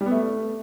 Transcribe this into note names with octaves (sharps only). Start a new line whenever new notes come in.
G3
B3
A3